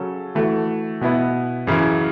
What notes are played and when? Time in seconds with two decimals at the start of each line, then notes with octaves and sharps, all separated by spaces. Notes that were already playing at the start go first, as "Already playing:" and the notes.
Already playing: C#3 F#3 C#4 A4
0.35 E3 A3 F#4 A4
1.01 B2 B3 E4 B4
1.67 F#2 C#3 E3